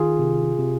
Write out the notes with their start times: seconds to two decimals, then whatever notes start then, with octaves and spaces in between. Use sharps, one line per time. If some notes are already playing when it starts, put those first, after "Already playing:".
Already playing: D#3 F4 G#4
0.19 C3
0.59 C3